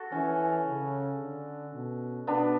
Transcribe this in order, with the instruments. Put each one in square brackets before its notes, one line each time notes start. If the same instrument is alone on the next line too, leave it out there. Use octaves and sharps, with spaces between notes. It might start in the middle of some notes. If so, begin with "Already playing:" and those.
Already playing: [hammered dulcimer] F#4 A4
[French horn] E3 [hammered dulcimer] C#4
[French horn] C#3
D3
B2
[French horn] B2 [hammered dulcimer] B3 D4